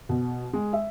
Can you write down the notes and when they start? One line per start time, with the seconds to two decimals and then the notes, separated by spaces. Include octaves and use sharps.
0.09 B2
0.53 G#3
0.73 E5